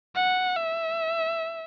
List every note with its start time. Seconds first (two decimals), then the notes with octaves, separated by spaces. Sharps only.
0.16 F#5
0.56 E5